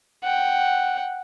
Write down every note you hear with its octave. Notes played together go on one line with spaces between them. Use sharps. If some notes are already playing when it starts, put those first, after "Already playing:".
F#5 G5